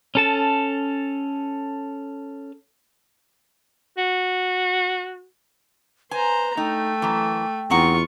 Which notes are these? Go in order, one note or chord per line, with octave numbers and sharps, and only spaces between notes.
C#4 A4 A5
F#4
B4 C5 G#5 A#5
A3 D#4 G5
F#2 E3
E2 C4 D#4 F4 F#5 C#6